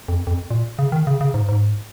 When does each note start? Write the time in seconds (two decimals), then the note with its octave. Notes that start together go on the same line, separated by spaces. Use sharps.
0.08 F2
0.27 F2
0.51 A#2
0.79 C#3
0.92 D#3
1.07 C#3
1.21 C#3
1.34 G#2
1.49 G#2